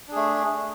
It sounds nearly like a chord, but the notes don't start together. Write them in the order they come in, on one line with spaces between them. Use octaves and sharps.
D4 G#4 A3